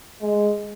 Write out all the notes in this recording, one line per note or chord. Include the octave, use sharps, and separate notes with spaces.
G#3